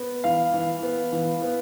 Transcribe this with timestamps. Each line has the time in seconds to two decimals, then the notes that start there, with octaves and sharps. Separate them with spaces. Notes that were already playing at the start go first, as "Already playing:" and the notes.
Already playing: B3
0.24 E3 F5
0.53 E3
0.83 B3
1.12 E3
1.42 B3